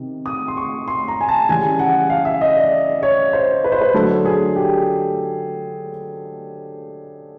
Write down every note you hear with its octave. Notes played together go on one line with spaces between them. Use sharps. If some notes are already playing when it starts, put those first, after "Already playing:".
Already playing: C3 D#3
D#6
C6
C#6
C6
A#5
G#5
A5
C#3 E3 G3 G#5
F#5
F5
E5
D#5
D5
C#5
C5
B4
C5
B4
D3 F#3 A3 A4
G#4
G4